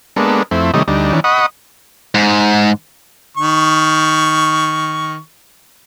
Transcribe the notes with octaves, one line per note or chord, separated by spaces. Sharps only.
G#3 A#3 B3 D4 A4
F2 A3 C4 E4
C3 D#3 G3 A3 C#5 D#5
D2 G3 D4 D#4
D#3 E3 C#4 D4
D#5 F#5 B5 C#6 D#6
G#2
D#3 C#6